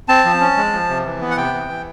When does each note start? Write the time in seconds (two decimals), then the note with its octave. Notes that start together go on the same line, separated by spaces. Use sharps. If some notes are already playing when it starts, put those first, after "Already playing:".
0.09 C4 A5
0.25 F3
0.40 C#4
0.57 G#3
0.73 F3
0.89 C3
1.05 E3
1.21 B3
1.31 F#5
1.37 C3 G5
1.53 E3
1.69 E3